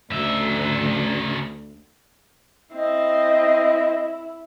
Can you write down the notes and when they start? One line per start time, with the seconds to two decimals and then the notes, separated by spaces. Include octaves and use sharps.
0.11 D2 C#3 E5
2.74 C4 E4 D#5